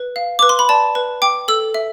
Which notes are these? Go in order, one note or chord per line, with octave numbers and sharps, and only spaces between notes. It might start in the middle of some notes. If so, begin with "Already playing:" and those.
Already playing: B4
F5
B4 D6
C6
B5
D5 A5
B4
G5 D6
A4 E6
E5